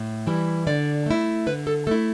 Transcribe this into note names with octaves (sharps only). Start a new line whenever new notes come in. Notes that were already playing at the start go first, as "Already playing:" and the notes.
Already playing: A2
E3 G3 E4
D3 D5
A3 E4
D3 B4
A4
A3 E4 A4